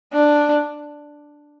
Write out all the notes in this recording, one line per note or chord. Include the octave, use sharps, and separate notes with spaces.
D4